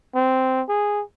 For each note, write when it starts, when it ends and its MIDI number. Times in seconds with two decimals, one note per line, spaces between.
0.15 0.62 60
0.69 1.02 68